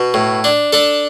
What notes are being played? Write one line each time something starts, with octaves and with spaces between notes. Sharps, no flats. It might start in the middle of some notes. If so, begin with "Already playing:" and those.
Already playing: B2
A2
D4
D4 A4